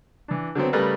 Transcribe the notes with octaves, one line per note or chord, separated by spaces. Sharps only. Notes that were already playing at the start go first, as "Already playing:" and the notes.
E3 D4
D3 F#3 B3 C4
C#3 G3 A3 A#4 B4